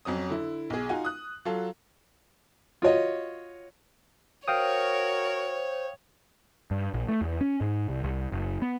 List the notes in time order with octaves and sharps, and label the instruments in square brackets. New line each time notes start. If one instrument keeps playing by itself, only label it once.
[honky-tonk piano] F2 F#3 C#4 D#6
D3 E4
B1 G#4
D#4 F4 F#4 G#5
D#6 F#6
F#3 F4 A4
[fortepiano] F4 F#4 C#5 D#5
[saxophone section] F#4 A#4 [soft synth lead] C5 [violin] C#5 [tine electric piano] F5 G5 D#6
[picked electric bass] G2
A#1
A3
E2
C#4
G#2
C2
C2
F#1
B3